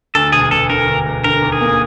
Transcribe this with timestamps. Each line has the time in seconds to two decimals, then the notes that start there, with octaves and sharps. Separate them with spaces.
0.15 D2 A4
0.32 E1 G#4
0.51 E1 A4
0.70 D3 A#4
0.87 D2
1.06 E1
1.24 D3 A#4
1.42 D#2
1.52 G#4
1.61 A#3